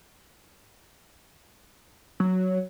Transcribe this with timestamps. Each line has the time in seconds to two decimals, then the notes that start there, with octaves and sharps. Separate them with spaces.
2.20 F#3